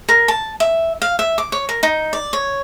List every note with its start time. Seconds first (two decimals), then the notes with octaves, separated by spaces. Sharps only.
0.09 A#4
0.28 A5
0.60 E5
1.02 F5
1.19 E5
1.38 D6
1.52 C#5
1.69 A#4
1.83 D#4
2.13 D5
2.33 C#5